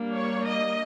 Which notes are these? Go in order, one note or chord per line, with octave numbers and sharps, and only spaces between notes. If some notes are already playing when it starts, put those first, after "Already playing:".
Already playing: G3 A#3 D4
C#5
D#5